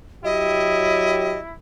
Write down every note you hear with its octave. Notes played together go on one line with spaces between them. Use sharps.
F#3 E4 G4 D#5